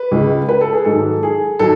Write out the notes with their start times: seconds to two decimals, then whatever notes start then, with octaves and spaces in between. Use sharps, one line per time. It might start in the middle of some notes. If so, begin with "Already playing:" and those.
Already playing: B4
0.12 C#2 C#3 G#3
0.49 B4
0.61 A4
0.73 G#4
0.85 G#2 D#3 F#3 A4
1.23 G#4
1.59 D#3 F#3 A4